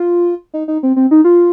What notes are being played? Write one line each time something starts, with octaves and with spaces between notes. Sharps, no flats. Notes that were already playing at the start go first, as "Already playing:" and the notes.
Already playing: F4
D#4
D#4
C4
C4
D#4
F4